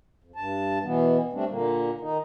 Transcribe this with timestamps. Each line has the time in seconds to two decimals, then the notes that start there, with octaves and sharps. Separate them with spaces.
0.24 F2
0.36 G2 A5
0.83 B2 E3 B3
1.33 G3 A3 C4 D4
1.48 A#2 D3 A#3
2.01 D#3 D#4